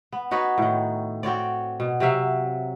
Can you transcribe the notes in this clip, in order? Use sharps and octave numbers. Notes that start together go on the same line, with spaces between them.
B3
D#4 F#4 B4 C#5
A2 D#3
C4 F#4 C#5 D5
B2
C3 F#3 E5 F5